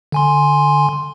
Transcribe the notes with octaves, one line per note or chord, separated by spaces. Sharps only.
D3 G#5 C6